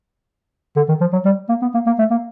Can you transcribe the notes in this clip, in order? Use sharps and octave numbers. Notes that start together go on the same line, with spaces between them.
D3
D#3
F3
F#3
G3
A#3
B3
A#3
A#3
A3
A#3